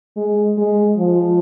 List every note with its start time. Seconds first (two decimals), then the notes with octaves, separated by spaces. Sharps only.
0.17 G#3
0.58 G#3
0.97 F3